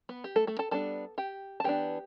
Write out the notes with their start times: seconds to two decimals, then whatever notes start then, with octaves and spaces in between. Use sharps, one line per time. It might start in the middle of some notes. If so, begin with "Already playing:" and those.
0.09 B3 B4
0.24 G4
0.36 A3 A4
0.47 A3 A4
0.59 A4 A5
0.71 G3 B3 D4 A4 A5
1.18 G4 G5
1.60 A5
1.64 E3 B3 D4 G4 G5